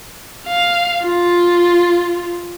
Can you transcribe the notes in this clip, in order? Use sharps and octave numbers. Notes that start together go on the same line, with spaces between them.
F5
F4